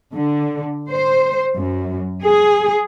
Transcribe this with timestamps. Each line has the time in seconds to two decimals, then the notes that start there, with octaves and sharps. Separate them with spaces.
0.14 D3
0.89 C5
1.56 F#2
2.23 G#4